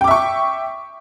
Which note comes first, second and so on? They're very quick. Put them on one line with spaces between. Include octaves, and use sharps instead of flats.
G5 D6 E5 C#6